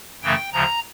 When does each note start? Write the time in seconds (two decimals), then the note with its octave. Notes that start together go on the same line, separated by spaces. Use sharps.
0.23 F#2 C#3 E3 A3 G5
0.53 D2 C#3 F3 A#5